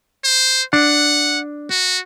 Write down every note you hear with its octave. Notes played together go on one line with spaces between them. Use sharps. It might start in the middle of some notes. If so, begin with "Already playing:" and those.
C5
D4 F#5
F#4